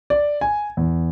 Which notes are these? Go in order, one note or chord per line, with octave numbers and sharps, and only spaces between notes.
D5
G#5
E2